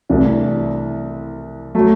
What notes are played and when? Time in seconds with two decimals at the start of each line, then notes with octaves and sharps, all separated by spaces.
0.09 C2 C3 E3 A3 D4
1.75 F#3 A3